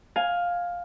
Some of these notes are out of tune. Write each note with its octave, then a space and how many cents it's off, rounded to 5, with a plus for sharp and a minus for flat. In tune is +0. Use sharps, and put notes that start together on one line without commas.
F5 +10 G#5 +5